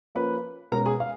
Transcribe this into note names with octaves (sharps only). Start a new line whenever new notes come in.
F3 A#3 C#4 B4 B5
B2 G#3 C#4 A#4 A#5
G#4 G#5
F5